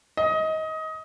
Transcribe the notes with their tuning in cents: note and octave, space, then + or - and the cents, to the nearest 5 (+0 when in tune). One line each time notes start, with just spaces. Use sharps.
D#5 +25